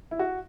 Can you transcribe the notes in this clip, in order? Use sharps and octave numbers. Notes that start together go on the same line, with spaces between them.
E4
F#4